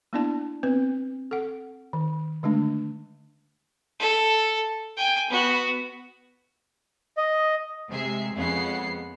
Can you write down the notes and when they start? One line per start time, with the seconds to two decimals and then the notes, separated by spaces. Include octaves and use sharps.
0.13 A#3 B3 D4 E4 D5 A5
0.63 B3 C4 B4
1.31 A4 F#5
1.93 D#3
2.43 D3 G#3 A3 D4
3.99 A4
4.97 G5 G#5
5.30 B3 F#4
7.17 D#5
7.89 C3 G#3 G#4 E5 C7
8.35 F2 C#3 G#3 B3 F#5 C7